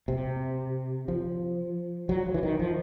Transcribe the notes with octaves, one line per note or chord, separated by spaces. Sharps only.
C3
F3
F#3
F3
E3
D#3
F3